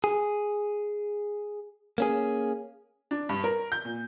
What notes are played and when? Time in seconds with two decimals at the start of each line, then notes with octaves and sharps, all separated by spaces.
0.04 G#4
1.98 A#3 C#4 G#4
3.11 D4
3.29 G2
3.44 A#4
3.72 G6
3.85 A#2